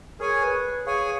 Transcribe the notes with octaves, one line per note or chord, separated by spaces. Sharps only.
G#4 A#4 C#5 G#5
B4
G#4 C#5 F5 G#5